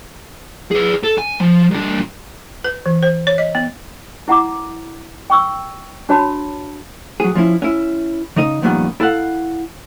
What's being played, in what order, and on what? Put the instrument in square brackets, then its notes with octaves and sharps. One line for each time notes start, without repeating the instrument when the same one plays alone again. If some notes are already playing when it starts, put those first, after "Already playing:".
[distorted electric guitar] G#4 B4
A4
G#5
F3
C2 D4
[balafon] B4
E3
C5
C#5
D#5
B3
[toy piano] E4 F#5 A#5 D6
G5 C#6 E6
D4 F#4 C#5 A5 B5
[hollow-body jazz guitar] F#3 G#4
F3 C#4 E4
C#4 E4
C#3 D#4 D#5
F2 A#2 D#3 G3 B3 C#4
E4 A4 F5 F#5